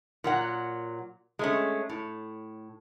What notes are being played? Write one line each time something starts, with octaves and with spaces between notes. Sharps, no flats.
A#2 F#3 F#5
G#3 A3 C#4
A2